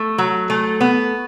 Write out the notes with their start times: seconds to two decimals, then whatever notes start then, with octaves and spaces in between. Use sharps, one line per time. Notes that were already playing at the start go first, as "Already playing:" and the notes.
Already playing: A3
0.18 F#3
0.50 A3
0.81 B3